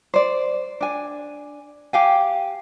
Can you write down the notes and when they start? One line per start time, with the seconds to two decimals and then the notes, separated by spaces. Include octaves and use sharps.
0.14 C5 D5
0.81 D4 G#5
1.93 G4 F5 G#5